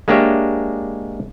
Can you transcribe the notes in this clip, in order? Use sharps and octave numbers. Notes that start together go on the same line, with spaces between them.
G#3 A#3 D4 G4 C#5 E5